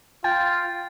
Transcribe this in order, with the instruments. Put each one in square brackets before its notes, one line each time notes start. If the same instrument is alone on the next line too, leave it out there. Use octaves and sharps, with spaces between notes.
[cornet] F4 [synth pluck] G5 [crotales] A6